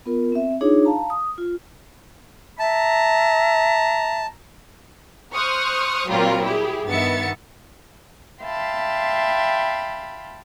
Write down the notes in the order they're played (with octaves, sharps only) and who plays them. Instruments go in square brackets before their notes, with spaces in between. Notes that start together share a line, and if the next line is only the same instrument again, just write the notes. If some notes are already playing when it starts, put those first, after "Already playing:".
[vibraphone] B3 F4 A#4
C4 E5
D4 D#4 F4 G#4 C#5
F5 A5 A#5
D#6
F4
[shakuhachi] E5 [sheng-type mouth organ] A5 [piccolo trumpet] A#5
[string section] C5 C#6 D#6 F6 F#6
A#2 F#3 G3 C4 F4 A#4
E4 G4 G#4
G2 D#3 B3 E5 A6 C#7
[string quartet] E5 F5 G5 A5 B5 C6